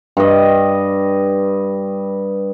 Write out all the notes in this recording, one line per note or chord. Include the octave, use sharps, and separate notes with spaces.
G2 D#5